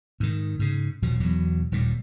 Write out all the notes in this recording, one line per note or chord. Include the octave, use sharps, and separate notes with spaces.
G#2 D#3
G#2 C#3
D#1 B2 F3
E2 B2 F#3
D#1 D#2 A#2 G3